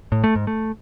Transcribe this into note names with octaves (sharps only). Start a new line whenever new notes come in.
A2
A3
G#2
A3